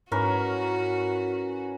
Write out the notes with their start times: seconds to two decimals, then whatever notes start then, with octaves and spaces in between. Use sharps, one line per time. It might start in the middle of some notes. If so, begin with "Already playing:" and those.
0.12 G#2 C#4 E4 F#4 A#4 B4 D6